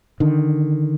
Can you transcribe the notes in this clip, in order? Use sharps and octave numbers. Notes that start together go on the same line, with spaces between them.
D3 D#3